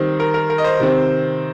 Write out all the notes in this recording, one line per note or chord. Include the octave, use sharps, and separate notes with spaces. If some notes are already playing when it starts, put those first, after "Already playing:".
Already playing: D#3 G3 C4 C5
A#4
A#4
A#4
D#5
C5
C3 D#3 C4